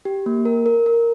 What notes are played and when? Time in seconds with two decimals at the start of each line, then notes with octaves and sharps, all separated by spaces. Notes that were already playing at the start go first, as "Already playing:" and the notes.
0.05 G4
0.26 A#3
0.45 A#4
0.66 A#4
0.86 A#4